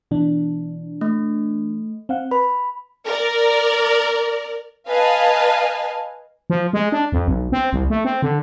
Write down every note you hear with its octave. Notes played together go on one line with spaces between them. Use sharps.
B2 E3 D4
A3
C4 F5 F#5
B4 B5
A#4 D5
B4 D#5 F5 G#5 A5
F3
G#3
D4
F2
B1
C4
C2
A3
C4
D3